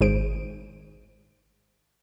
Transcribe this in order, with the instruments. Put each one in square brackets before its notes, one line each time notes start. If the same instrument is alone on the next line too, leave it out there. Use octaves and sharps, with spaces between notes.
[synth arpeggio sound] G#1 G#4 C5 D7